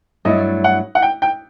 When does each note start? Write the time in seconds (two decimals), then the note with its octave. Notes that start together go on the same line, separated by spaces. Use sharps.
0.25 G2 F#3 A3 E4 D#5
0.64 F#5
0.95 F#5
1.02 G5
1.22 G5